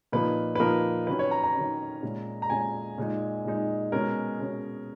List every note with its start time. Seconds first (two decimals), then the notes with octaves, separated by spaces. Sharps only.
0.12 A#2 F3 A#3 D#4 B4
0.55 B4
0.60 A#2 F3 A#3 D#4 A#4
1.07 D#3 F#3 C#4 B4
1.19 C#5
1.31 A#5
1.43 A#5
1.55 D#3 F#3 C#4
2.02 A#2 G#3 C#4
2.42 A#5
2.50 A#2 G#3 C#4 G#5
2.98 A#2 G#3 D#4
3.45 A#2 G#3 D#4
3.92 B2 G#3 C#4 A#4
4.40 B2 G#3 C#4